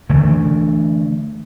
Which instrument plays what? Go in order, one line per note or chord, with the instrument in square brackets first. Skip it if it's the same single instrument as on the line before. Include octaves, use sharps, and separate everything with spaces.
[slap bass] D3 E3 A3